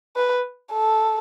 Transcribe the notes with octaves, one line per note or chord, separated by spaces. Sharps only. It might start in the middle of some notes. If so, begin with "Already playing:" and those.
B4
A4